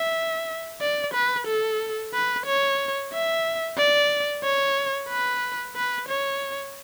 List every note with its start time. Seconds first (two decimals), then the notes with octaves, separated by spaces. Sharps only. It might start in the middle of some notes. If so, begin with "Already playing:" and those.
Already playing: E5
0.81 D5
1.14 B4
1.47 A4
2.14 B4
2.46 C#5
3.13 E5
3.78 D5
4.44 C#5
5.09 B4
5.76 B4
6.09 C#5